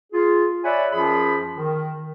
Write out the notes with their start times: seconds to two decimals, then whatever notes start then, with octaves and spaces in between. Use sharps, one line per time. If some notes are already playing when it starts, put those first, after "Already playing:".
0.13 F4 G#4
0.64 C#5 D5 E5 F#5 G#5 B5
0.93 F#2 F3 F4 G#4 B5
1.57 D#3